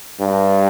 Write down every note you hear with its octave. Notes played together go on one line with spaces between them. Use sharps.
G2